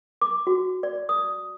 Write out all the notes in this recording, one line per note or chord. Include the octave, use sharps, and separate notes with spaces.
D6
F#4
D5
D#6